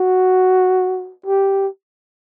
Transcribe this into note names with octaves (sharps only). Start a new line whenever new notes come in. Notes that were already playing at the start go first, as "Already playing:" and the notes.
Already playing: F#4
G4